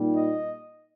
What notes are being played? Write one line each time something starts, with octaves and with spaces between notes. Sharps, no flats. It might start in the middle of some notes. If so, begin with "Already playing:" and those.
Already playing: A#2 G3 A#3 D#4
D#5